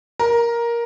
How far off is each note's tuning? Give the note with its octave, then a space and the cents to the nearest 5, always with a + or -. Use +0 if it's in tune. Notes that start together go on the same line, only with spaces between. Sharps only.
A#4 +10